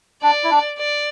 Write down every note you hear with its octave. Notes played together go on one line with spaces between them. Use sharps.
D4 D5
E4
D4
D5